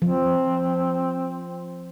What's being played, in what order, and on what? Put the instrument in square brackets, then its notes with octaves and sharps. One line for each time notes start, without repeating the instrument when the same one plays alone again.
[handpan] F3 [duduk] C4